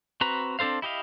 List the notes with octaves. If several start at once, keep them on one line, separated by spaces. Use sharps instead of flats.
C4 F#4 B4 A#5
C4 D4 A4 C5 F5
E4 G4 D#5 F5